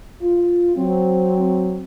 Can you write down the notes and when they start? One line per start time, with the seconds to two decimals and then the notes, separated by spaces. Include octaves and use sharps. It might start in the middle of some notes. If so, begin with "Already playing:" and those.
0.22 F4
0.76 F#3 C4